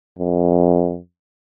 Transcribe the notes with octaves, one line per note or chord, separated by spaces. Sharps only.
F2